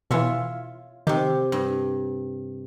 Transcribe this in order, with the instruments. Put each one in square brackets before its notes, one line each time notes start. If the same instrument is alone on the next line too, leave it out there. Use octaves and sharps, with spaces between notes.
[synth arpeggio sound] B2 E3 [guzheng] F4 C#5 E5
[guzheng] C3 G4 [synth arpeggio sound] D#3
[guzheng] G2